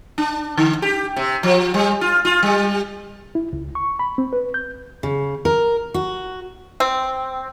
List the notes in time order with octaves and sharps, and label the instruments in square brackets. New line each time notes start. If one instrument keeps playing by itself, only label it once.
[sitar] D4
D3
G4
C3
F3
G3
F4
F4
G3
[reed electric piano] E4
C#2
C#6
B5
C4
B4
G6
[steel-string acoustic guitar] C#3
A#4
F#4
[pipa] C4